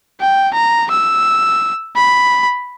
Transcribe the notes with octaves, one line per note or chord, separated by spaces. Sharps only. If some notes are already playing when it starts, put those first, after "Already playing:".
G5
A#5
E6
B5